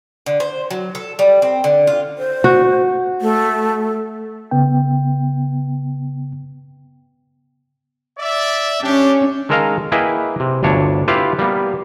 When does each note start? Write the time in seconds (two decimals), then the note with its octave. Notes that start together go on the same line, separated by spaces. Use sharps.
0.26 D3
0.40 C5
0.71 F#3
0.95 A4
1.19 G3
1.42 C4
1.64 D3
1.87 F4
2.18 C5
2.44 F#4
3.21 A3
4.51 C#3 B3 G5
8.19 D5 E5
8.82 C#4 D4 G4
9.49 D#3 G#3 A4 A#4 D#5 F5
9.92 A#3 E4 G#4 B4 D#5 G5
10.40 C3
10.63 G1 D2 D4 C#5
11.08 E4 F4 G4 B4 F5
11.39 G3 A#3 B3